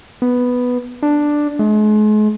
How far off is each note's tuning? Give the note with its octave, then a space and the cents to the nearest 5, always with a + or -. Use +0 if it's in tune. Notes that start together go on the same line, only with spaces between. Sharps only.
B3 +0
D4 +5
G#3 +40